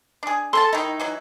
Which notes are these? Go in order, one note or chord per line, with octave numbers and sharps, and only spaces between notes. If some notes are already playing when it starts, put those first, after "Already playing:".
D4 G#4
A4 G#5 A5 C6
D#3 D#4 E4
E3 F#3 E4